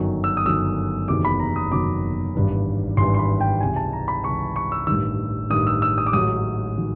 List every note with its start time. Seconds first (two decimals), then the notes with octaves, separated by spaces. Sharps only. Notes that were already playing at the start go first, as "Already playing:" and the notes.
Already playing: G1 F#2 D#3 F#3
0.24 E6
0.37 D#6
0.45 G1 F#2 D#3 F#3 E6
1.08 F#1 E2 C3 D#3 F#3 D6
1.25 B5
1.40 A#5
1.56 D#6
1.72 F#1 E2 C3 D#3 F#3 D6
2.35 G#1 G2 E3
2.97 G#1 G2 E3 C6
3.14 C6
3.19 B5
3.41 G5
3.61 C#2 C3 E3 G#5
3.76 A5
3.93 A#5
4.08 B5
4.24 C#2 C3 E3 C#6
4.56 C#6
4.72 E6
4.87 A1 G2 D#3 E6
5.50 A1 G2 D#3 D#6
5.67 E6
5.82 E6
5.98 D#6
6.06 D6
6.13 A1 G#2 D#3 F#3 D#6
6.77 D#3 F#3